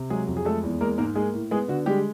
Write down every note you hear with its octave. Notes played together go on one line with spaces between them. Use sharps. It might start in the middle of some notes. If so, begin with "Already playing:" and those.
Already playing: C3
F#3 G#3 G#4
F2
G#4
G#3 A3 A4
E2
G#3 A#3 A#4
G#2 A#3 A#4
G#3 A#3 G#4
A2
G#3 B3 G#4
D3 F#4
G3 G#3 G4